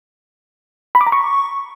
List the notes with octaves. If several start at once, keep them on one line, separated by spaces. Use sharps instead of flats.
B5
D6
A#5
C#6